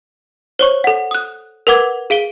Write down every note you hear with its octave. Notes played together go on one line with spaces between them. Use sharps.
C5 C#5 C#6
A4 F#5
D#6 F#6
A#4 B4 F#5 D6 G#6
G#4 F5 D7 G7